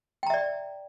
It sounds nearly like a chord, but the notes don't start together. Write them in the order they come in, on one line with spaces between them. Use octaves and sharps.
G5 A#5 E5 D5